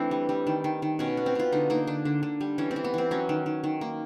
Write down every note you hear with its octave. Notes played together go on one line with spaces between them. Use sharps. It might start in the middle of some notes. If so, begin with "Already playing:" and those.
Already playing: E3 A3 C4 D4 E4
G3
G3
D#3
D#3
D#3
B2 C#4
B3
C4
B2 F4
D3 D#4
A#3 D#4
D3 D4
D3
D3
G3
E3 C#4
C4
E3
B3
E3 C4
F#3 C#4
D#3
D#3
D#3
A#3